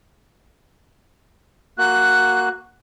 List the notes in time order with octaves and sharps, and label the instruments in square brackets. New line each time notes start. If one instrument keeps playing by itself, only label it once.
[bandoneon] A#3 F#4 [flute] F#6